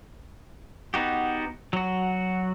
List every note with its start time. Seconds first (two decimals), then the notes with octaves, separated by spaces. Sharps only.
0.94 B3 D#4 F#4 G4
1.73 F#3 F#4